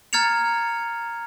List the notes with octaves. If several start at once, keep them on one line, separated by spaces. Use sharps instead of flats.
A#5 F6 G#6 A6 C#7 F7